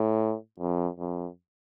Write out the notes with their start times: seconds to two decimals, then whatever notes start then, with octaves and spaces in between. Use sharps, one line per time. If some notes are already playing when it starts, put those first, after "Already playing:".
Already playing: A2
0.60 F2
0.99 F2